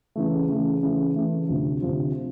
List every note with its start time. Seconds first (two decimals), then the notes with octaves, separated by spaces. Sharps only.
0.16 C#3 E3 A3
0.48 C#3 E3 A3
0.83 C#3 E3 A3
1.16 C#3 E3 A3
1.49 D2 C3 F3
1.82 D2 C3 F3